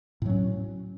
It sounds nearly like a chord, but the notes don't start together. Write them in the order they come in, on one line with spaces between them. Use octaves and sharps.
A2 F#3 C#4